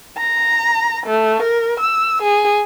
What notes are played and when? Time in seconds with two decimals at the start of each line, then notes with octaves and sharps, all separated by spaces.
0.18 A#5
1.07 A3
1.42 A#4
1.80 E6
2.22 G#4